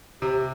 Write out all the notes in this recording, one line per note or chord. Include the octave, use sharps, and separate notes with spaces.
C3 G4